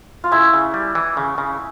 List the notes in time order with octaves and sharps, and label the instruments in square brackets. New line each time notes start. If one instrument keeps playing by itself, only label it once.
[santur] F4
[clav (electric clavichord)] C#3 [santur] E4
[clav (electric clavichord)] C#3
G3
E3
C#3
C#3